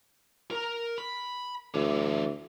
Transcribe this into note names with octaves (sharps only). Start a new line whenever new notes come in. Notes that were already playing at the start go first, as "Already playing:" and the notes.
A#4 A#5
B5
D2 D3 E3